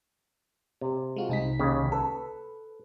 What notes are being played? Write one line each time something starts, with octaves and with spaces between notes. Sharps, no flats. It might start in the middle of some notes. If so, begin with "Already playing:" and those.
C3
G#3 F4 F#4
C2 D#4 B6
D#2 C#3
A4 B4